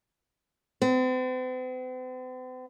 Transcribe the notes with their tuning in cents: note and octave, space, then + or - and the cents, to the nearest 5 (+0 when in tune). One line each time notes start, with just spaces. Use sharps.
C4 -45